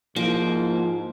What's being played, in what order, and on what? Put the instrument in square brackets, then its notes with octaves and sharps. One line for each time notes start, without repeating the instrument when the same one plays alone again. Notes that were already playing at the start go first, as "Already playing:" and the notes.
[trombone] G#2 [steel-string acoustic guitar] F3 [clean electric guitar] A#3 [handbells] E4 D7